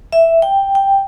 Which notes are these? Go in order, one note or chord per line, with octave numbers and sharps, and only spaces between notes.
E5
G5
G5